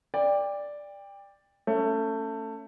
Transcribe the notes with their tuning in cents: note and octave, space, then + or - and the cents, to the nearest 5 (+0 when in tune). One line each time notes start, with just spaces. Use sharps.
D5 +0 G5 +25
A3 +20 C#4 +0